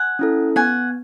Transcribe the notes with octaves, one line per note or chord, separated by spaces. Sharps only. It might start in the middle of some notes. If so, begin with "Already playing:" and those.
Already playing: F#5 G#5
C#4 E4 A4
B3 F#5 G#5